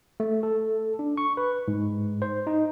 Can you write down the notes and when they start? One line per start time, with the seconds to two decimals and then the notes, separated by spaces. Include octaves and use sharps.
0.20 A3
0.43 A4
0.99 D4
1.17 C#6
1.37 B4
1.68 G#2
2.22 C5
2.47 D#4